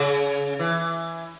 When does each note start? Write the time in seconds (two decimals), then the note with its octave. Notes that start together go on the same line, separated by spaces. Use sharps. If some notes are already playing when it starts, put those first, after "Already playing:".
Already playing: C#3
0.59 E3